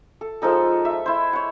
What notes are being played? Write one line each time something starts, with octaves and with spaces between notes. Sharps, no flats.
A4
F3 G#3 D#4 A4
E5
E4 C5
C#5 F#5